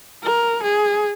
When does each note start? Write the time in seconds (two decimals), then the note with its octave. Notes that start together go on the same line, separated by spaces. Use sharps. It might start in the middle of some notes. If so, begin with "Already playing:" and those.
0.24 A#4
0.63 G#4